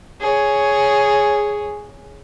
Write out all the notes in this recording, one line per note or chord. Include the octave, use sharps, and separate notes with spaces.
G#4 C#5